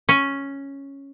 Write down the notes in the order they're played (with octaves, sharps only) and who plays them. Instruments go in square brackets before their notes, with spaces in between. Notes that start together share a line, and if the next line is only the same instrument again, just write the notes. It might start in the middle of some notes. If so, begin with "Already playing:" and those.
[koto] C#4